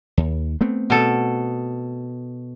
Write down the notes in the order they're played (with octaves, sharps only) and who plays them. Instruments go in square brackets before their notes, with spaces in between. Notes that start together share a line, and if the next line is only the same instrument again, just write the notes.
[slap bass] D#2
A3 B3 C4
[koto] B2 A4